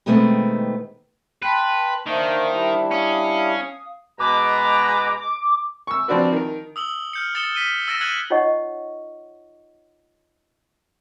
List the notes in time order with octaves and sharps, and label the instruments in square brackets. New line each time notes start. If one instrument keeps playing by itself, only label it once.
[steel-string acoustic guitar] B2 D#3 G#3 A3 B3 C4
[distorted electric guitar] B4 [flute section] G5 A5 C6
[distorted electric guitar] D#3 [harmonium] A#3 D4 D#4 [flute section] C5 E5
[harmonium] G3 D4 E4
[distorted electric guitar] C#4 [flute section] F5 D#6
[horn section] B2 G#3 A#5 [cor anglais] B4 [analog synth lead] D6
[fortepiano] C#6 E6
F3 C4 D4 F#4 B4
D#3 A#4
[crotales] D#6 E6 F#7 G7
F6 G6 C#7
D#6 A6 C#7 E7 G7
B6 D#7 G7
E6 A6 A#6 D7 E7
F#6 G#6 C#7 D#7 F#7
[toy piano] D#4 F4 C#5 D#5 F#5 C#6